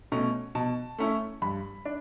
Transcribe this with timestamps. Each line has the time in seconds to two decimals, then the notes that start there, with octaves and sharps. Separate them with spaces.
0.12 B2 A3 C#4
0.55 B2 A5
0.98 A3 C#4 E4
1.42 G2 B5
1.85 D4